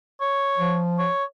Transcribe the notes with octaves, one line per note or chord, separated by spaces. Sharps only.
C#5
F3
C#5